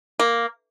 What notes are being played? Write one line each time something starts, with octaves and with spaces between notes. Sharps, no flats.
A#3